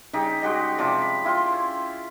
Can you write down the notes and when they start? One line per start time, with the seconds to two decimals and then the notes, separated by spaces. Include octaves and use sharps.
0.13 C#3 G3 D#4 G4
0.42 G#3 F#4 G4 D#5
0.78 C3 F3 D5 D6
1.02 B5
1.25 E4 F4 G5 C6
1.52 C#4